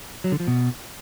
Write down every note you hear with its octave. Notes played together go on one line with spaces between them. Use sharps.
F#3
D3
F3
B2